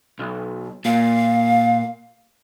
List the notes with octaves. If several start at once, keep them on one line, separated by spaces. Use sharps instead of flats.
B1
A#2 F5